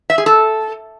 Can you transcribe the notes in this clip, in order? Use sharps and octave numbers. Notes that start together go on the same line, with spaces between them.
E5
G#4
A4